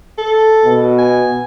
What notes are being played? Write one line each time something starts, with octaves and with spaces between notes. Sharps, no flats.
A4
B2
G#5